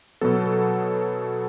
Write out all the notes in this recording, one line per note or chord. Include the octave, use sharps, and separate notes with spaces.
B2 F#3 B3 A4